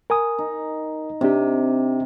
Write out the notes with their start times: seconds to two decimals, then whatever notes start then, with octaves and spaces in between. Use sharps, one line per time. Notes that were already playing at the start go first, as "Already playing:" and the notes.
0.10 A#4 G#5 D#6
0.38 D#4
1.21 C3 C4 D4 G4